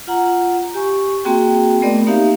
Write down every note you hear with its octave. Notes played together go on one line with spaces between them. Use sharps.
F4 F#5 A#5
G4 G#5 C#6
A#3 C4 F#4 G#4 G5
A3 B3 C4 A#4 D5 D#5
A#3 D#4 G4 E5 F5